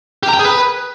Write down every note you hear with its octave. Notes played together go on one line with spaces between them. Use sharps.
G4
A#5
G5
G#4
B4